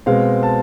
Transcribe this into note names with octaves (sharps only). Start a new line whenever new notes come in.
B2 G#3 C4 F5
A5